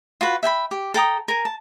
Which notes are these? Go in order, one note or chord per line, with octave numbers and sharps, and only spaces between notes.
F4 F#4 B4
E5 G5 G#5 B5
G4
A4 G5 A#5 D#6
A#4 G#5
A5